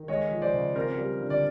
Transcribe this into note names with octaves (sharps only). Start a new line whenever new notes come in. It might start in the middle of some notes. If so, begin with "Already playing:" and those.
Already playing: D#3
G#3 C#5 D#5
F3
C5 D5
C#3
C4 A#4 C5
G3
D3
D5